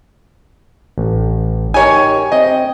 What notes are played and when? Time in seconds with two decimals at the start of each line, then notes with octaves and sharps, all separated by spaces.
0.98 A1
1.74 D#4 G4 A#4 C#5 G#5
2.32 C4 D#5 G5